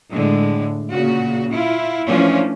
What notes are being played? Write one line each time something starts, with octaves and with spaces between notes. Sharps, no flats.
A2 D3 G#3
A#2 C#3 F#4
E4 F4
E3 F3 A3 C#4 D4 F4